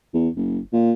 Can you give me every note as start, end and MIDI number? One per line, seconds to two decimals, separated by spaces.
0.14 0.28 40
0.36 0.58 30
0.73 0.92 46